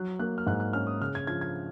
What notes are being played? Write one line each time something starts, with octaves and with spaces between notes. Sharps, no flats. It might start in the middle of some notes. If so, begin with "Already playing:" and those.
Already playing: F#3 F#6
A#3 F#6
F6
G#2 F#6
F#6
C#4 F6
D#6
C#3 F6
G#6
F3 G#6
G#6